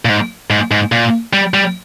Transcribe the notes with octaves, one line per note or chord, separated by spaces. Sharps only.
A#2
G#2
G#2
G#2
A#2
G3
G3